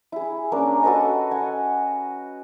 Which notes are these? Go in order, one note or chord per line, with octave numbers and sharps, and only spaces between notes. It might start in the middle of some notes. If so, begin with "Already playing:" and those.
E4 G#4
A#3 C#4 D4 A#4
F#4 A4 B4 D#5
D#5 F#5 G#5